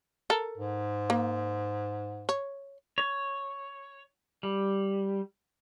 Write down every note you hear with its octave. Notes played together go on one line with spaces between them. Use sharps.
A4 A#4
G#2
A#3
C#5
C#5
G3